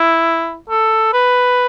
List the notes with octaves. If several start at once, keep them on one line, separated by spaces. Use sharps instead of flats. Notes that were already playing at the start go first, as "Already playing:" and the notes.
Already playing: E4
A4
B4